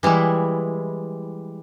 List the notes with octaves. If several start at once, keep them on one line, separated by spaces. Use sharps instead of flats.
E3 G3 G#3 E4